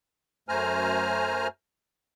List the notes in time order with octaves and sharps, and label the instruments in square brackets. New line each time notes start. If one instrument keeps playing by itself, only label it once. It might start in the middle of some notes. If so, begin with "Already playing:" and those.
[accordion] F#2 A3 C5 G#5 A#5 F6